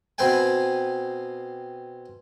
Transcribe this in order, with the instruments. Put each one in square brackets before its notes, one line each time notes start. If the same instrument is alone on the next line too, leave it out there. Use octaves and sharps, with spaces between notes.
[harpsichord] B2 C4 B4 C5 G5 G#5